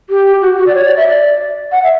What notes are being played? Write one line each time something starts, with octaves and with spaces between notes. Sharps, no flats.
G4
F#4
F#4
D5
C#5
D5
E5
D5
F#5
E5